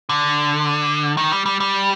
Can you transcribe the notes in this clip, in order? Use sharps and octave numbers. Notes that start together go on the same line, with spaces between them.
D3
D#3
G3
G3
G3